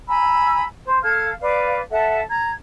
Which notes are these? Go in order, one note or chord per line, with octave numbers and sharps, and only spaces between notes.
G#5 A#5 B5 E6
C5
A4 F5 F6 G#6
B4 D5 F5
A4 E5 F#5 A5
A#5 G#6